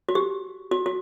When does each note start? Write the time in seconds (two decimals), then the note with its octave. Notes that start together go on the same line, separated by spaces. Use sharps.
0.09 F#4
0.15 G4
0.71 F#4
0.86 F#4